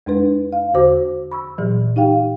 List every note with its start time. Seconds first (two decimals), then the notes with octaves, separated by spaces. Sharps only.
0.06 F2 G#3 D4 B4
0.53 F5
0.74 E2 D3 F#4 C5 D6
1.31 B5 C#6 E6
1.58 A#2 E3 F#3
1.96 D#4 G4 F5 G5